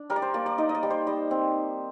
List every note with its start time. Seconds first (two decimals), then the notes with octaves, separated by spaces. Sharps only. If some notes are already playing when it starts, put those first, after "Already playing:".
Already playing: D4
0.10 G3 A#4
0.16 D5
0.22 C5
0.34 A#3 D5
0.46 D5
0.58 D#4 D#5
0.69 D#5
0.75 D5
0.83 G3
0.90 C5
1.07 G3 D#5
1.31 C4